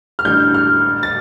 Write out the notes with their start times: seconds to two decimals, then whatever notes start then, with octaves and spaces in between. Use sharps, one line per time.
0.19 F6
0.25 A1 G2 D3 A3 G6
0.54 F6
1.03 A6